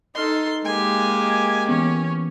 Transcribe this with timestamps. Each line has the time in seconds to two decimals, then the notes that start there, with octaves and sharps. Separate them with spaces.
0.15 D#4 A4 D#5 C6 F6
0.65 G#3 A#3 G4 G#5
1.69 E3 B3 C#4